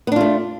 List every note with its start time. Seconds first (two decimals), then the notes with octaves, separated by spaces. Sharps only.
0.07 B3
0.12 D4
0.16 F4
0.21 A3